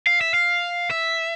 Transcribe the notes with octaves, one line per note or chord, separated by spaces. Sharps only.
F5
E5
F5
E5